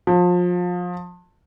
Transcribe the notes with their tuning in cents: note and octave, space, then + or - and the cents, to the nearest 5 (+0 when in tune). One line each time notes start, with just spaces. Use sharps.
F3 +30